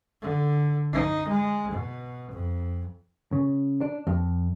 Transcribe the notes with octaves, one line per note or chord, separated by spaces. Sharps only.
D3
D#4
G#3
B2
F2
C#3
D4
F2